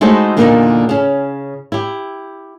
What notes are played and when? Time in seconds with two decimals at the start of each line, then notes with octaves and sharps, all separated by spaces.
0.01 G#3 A3 D#4 E4 F#4 C5
0.37 E2 A#2 D3 A#3 D4 D#4
0.89 C#3 C#4
1.72 E4 G4